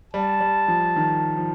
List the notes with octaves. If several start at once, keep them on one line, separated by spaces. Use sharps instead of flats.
G3 A5
G3
F3
D#3
F3